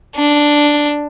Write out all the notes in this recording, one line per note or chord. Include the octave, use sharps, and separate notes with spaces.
D4